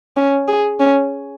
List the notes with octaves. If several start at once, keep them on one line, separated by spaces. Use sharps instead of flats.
C#4
G#4
C#4